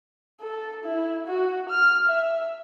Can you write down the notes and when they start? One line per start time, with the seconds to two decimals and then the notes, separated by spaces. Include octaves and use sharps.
0.41 A4
0.85 E4
1.27 F#4
1.69 F6
2.08 E5